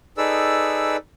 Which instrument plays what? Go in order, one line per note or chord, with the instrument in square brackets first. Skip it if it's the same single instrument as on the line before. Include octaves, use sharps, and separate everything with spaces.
[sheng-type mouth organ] D#4 G#4 A4 B4 D5 E6